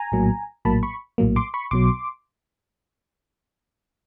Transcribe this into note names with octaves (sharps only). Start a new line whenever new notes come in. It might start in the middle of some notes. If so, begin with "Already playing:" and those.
Already playing: G#5 A#5
A#1 A2 F#3 A#3
A#1 A2 F#3 A#3 A5 B5
B5 C#6
A#1 A2 F#3 A#3
C6 D6
B5 C#6
B1 B2 F#3 C6 D6